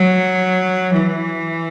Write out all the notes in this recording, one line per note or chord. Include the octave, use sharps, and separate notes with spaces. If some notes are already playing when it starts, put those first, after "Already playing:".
Already playing: F#3
E3